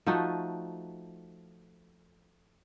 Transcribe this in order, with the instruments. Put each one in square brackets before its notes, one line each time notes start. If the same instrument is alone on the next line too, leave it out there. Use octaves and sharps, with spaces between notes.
[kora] F3 A3 D#4 F#4